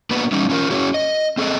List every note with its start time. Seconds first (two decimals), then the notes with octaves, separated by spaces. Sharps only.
0.11 A#3 B3 D4 F#4 B4
0.32 G3 C#4 D#4
0.50 C#4 F4 A#4
0.70 C#4 F#4 G#4 C#5
0.94 D#5
1.37 C4 G#4 A4 D5 D#5